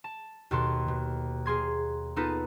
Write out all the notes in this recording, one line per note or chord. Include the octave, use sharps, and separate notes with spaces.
A5
D#2 B2 A4 C6
B2
A#3 G#4 C6 G#6
B3 D#4 F4 A4 B4